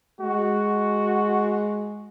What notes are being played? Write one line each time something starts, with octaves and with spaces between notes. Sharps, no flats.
G#3 F#4